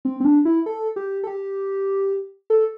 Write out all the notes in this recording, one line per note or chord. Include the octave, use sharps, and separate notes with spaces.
C4
C4
D4
E4
A4
G4
A4
G4
A4